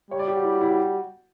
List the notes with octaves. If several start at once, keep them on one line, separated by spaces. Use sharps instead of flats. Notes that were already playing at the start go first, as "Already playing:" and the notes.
G3 C#5
D5
G4
F#4
E4
F#4
E4
F#4